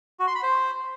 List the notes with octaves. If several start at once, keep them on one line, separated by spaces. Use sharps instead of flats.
F#4
C6
B5
C5